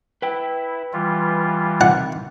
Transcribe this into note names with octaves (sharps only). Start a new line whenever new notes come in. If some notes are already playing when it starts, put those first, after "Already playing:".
E4 B4 G5
E3 G3 F4
C3 D#3 F#5